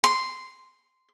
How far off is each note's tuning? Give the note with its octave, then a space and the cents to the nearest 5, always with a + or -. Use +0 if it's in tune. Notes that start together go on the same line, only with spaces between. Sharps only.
C6 -10